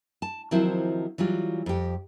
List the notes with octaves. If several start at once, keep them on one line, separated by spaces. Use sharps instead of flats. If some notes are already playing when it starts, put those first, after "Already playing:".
A5
D#3 F3 F#3 C4 E4 C5
E3 F#3 G3 F4
F2 G4